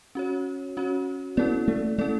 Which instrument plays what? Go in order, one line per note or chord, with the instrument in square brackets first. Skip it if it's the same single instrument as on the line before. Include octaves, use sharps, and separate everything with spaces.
[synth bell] C#4 F#4 C#5
C#4 F#4 C#5
[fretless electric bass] B3 [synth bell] C#4 E4 A4 D5
[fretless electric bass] A3
[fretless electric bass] A3 [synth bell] C#4 E4 A4 D5